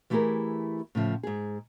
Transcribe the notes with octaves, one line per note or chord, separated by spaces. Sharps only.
E3 A3 E4 G4 G#4 A#4
A2 C#3 F3 E5
G#2 G#4